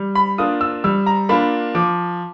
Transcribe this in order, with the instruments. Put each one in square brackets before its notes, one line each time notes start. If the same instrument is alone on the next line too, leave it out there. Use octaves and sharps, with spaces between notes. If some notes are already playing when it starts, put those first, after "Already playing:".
Already playing: [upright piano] G3
[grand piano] B5
[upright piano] A#3 D4 F4 [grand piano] D#6
[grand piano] E6
[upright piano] G3 [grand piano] E6
[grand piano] A#5
[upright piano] A#3 D4 F4 [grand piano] B5
[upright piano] F3 [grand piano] D6